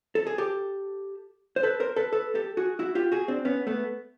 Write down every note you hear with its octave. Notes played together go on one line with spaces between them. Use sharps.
A4
G#4
G4 A4
C5
A4 B4
A#4 C5
A4 B4
A4 B4
G4 A4
F#4 G#4
E4 F#4
F4 G4
F#4 G#4
C4 D4
B3 C#4
A3 B3